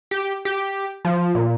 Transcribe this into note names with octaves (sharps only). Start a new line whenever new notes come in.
G4
G4
F3
A#2